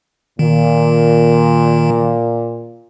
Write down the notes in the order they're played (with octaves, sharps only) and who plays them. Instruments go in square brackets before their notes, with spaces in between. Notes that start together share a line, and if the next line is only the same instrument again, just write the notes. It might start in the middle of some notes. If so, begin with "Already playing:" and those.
[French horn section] A#2 [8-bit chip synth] D#3